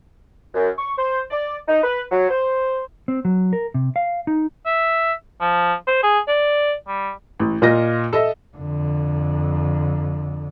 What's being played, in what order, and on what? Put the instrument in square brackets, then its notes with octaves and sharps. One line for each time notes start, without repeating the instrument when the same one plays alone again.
[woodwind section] F#2
C#6
C5
D5
D#4
B4
F#3
C5
[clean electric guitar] C4
F#3
A#4
C3
F5
D#4
[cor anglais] E5
F3
C5
G#4
D5
G3
[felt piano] A1
A#2 F4 D#5 A#6
A4 D#5 E5
[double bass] F2 D3